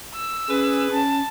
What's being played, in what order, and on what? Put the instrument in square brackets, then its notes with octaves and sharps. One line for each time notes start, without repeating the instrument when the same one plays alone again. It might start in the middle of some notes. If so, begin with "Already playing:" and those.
[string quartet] E6
[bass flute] C#4 [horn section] G#4 B4
[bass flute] C#4 [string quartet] A5